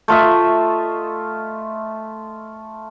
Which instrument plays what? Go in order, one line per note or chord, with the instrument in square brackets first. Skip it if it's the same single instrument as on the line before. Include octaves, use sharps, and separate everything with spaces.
[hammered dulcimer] A3 F4 D#5 E5